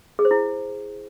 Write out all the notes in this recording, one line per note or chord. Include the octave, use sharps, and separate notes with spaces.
G#4
C5
E4